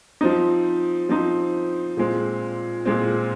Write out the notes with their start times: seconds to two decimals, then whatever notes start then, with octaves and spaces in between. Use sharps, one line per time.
0.21 F3 C4 D#4
1.09 F3 C4 D#4
1.97 A#2 G#3 C4
2.85 A#2 G#3 C4